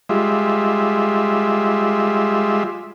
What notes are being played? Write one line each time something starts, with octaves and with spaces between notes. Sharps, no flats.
G3 G#3 F4 E5